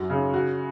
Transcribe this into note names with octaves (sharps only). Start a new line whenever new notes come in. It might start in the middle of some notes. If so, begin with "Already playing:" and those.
Already playing: F#2 F#4
C#3
F#4